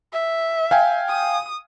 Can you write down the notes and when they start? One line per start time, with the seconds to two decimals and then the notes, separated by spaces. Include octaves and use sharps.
0.13 E5
0.71 F5 G5 G#5
1.09 D#6